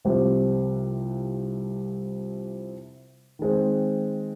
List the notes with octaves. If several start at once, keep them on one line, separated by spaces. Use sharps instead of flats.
C2 C3 F3 C4 G4
D#3 G#3 C4